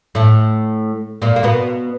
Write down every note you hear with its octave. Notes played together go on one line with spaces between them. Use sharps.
A2 A3
A#2 A#3
A#3
B2 B3